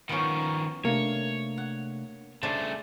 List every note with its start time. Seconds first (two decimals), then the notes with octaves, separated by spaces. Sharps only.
0.09 D#3 F3 B3 C#4
0.85 C3 A3 A#3 D4 C#5
1.58 F#5
2.43 C#3 A3 D4 G#4 C5